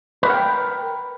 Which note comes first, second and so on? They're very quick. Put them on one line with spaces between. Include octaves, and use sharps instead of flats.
B4 A#4 F#5 G5